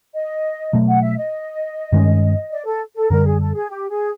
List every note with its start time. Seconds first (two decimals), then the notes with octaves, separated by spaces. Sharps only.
0.14 D#5
0.73 B2 F#3 A3
0.88 F#5
1.02 E5
1.17 D#5
1.92 G2 D#3 G#3 C#4
2.51 D5
2.65 A4
2.95 A4
3.10 F#2 D3 G3 A#4
3.25 G#4
3.40 A4
3.55 G#4
3.69 G4
3.89 G#4